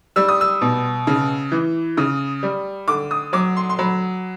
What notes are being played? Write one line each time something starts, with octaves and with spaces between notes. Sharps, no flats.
G3 E6
D#6
E6
B2
C#3
E3
C#3 D#6
G3
D3 D6
D#6
F#3 D6
C6
C6
F#3 B5